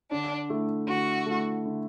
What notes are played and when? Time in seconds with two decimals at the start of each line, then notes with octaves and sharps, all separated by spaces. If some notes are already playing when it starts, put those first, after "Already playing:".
0.11 D3 D4
0.50 A3 E4
0.88 D3 F#4
1.26 A3 E4
1.65 D3